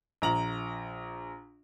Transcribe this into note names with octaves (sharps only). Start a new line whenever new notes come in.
A#1 A#5 F#7